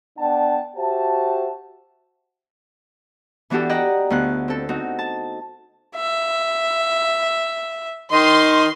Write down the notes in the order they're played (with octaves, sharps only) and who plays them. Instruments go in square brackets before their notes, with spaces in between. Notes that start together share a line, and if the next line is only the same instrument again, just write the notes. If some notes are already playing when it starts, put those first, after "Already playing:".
[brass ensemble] B3 D4 D5 F#5 G5 A5
F#4 G4 C5 E5 A5
[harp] E3 B3 D4 F#4 G4 A4
D5 D#5 F#5 G5 A#5
D2 B3 F4 F#6
C4 A4
C4 D#4 F#4
A5
[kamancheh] E5
[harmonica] D#3 D#5 [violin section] C6